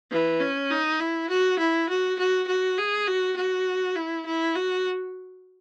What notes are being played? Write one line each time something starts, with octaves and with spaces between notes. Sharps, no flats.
E3
C#4
D#4
E4
F#4
E4
F#4
F#4
F#4
G#4
F#4
F#4
E4
E4
F#4